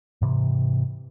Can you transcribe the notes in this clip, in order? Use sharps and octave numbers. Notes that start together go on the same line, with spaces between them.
G#2 C3 E3